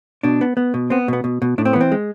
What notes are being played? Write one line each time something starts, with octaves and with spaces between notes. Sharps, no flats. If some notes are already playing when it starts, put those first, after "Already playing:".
B2 D4
B3
B3
B2
B3 C4
B2 B3
B2
B2
A2 D4
C4
E3 B3
C4
G#3